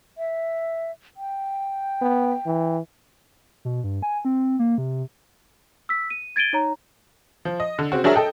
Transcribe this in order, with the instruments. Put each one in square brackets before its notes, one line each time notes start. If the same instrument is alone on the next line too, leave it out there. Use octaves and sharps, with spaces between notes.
[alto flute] E5
G5
[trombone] B3
E3
[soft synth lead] B2
G2
G#5
C4
A#3
C3
[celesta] E6 B6
D#7
G#6 A6 D7 D#7 G7
D#4 C#5 A#5
[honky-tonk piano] F3
D#5
D3
C#3 C4 F#4
F#3 D4 G#4 A#4 C#5 E5
A4 D#5 G5